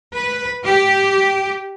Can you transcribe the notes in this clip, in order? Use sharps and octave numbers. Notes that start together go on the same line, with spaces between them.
B4
G4